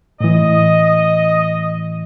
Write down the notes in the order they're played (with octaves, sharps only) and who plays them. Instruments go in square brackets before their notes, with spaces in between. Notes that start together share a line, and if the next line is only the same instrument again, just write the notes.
[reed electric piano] A2 E3 [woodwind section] D#5